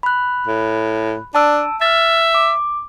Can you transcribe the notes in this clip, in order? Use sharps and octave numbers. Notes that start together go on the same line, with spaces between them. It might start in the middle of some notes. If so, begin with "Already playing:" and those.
B5 F#6
A2
D4 A5 E6 D7
E5 F6 A6
D6